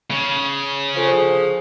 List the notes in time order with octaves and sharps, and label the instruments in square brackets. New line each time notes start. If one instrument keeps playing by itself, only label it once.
[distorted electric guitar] C#3
[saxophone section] D3 F3 [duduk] G#4